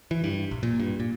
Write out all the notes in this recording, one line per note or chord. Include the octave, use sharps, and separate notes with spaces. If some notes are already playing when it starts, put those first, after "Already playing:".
E3
G2
A#1
A#2
G2
A#2